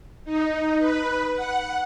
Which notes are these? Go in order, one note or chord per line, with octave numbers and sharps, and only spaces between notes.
D#4
B4
F#5